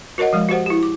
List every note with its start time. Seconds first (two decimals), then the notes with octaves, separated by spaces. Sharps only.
0.18 F#4 A#4 C#5 D#5 F#5
0.33 F3 G#3
0.49 F#4 G4 C5 F#5
0.66 E4 G4
0.83 D6